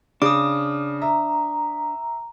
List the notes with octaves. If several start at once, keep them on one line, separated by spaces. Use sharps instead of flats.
C#3 D4 D6 D#6
E5 A#5